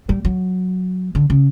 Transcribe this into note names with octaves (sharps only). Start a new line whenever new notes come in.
G3
F#3
D3
C#3